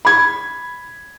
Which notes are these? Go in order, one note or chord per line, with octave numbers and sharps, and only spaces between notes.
B5 G#6